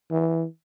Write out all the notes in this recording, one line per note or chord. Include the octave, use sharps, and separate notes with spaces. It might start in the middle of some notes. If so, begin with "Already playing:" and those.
E3